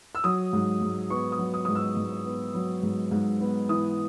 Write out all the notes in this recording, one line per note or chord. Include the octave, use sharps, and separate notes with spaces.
E6
F#3 D#6
G#2
G#2
B3 C#6
D#6
F#3
D#6
G#2 D#6
E6
G#2
B3
F#3
G#2
G#2
B3
E3 D#6